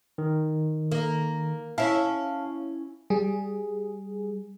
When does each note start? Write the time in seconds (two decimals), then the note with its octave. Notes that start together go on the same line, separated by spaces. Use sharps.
0.18 D#3
0.91 A#3
1.78 C#4 E4 F5 A5
3.10 G3 G#4